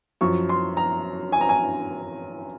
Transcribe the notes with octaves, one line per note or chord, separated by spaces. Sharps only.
F#2 F3 C#6
C6
A#5
G#5
A#5
G#5